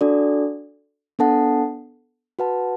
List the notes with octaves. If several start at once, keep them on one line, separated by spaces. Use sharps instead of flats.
D4 F#4 A4 D5
B3 D4 A4 F#5 A5
F#4 B4 F#5 A5